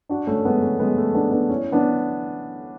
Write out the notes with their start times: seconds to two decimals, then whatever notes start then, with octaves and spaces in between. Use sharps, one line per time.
0.09 D4 F#4
0.27 A3 C#4
0.45 G#3 B3
0.62 A3 C#4
0.80 G#3 B3
0.97 A3
1.15 B3 D4
1.32 B3 D4
1.49 C#4 E4
1.72 B3 D4